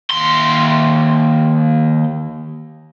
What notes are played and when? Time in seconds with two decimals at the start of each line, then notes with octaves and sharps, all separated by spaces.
0.10 D#2 C6